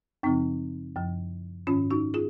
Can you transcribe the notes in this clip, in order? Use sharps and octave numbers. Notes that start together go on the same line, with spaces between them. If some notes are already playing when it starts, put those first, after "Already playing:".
F#2 C#3 F3 C4 D#4
F#2 F3
G#2 D#3 C#4 F4
D#4 F#4
F4 G#4